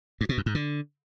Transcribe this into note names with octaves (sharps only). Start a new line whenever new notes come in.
G2
B2
F#2
G#2
D3